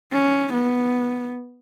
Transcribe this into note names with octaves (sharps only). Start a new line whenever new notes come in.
C#4
B3